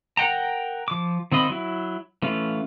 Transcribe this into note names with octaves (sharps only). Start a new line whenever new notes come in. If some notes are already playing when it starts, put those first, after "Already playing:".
A#4 F#5 G5 A#5
F3 D6
D#3 C4 F4 D#5 B5
F#3 E4
E3 A3 C#4 F4